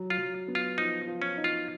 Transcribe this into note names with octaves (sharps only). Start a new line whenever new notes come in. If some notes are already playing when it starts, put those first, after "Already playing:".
Already playing: F#3
F4
F#3
B3
F4
F3 D#4
F3
C#4
D#4
F4